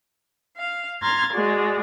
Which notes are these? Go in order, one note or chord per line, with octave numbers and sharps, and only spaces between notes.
F5
A#5 C6 F6 G#6 A6
G#3 F#4 D5